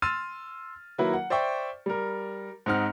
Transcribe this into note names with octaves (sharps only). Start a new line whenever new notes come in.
C6 E6 F6 A6 D#7
D#3 F#3 A#3 E4 B4
F#5
C5 D5 E5 G5 C#6 D6
G3 A#4
G#2 C4 D#4 F#5 F6